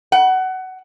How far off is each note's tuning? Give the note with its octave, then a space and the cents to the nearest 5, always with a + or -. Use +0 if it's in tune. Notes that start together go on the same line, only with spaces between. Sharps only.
F#5 +20